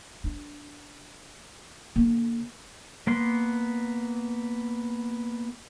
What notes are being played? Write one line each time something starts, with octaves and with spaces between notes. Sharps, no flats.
D4
D3 A#3
A#3 B3 C6